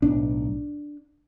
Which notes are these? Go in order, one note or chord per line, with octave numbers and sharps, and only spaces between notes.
B1 A2 D4